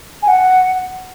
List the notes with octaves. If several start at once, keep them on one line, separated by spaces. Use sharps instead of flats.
G#5
F#5